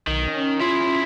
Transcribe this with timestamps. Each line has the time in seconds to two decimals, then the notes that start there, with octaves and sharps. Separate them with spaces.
0.07 B1 D#3
0.28 C#4
0.60 E4 F4 G#4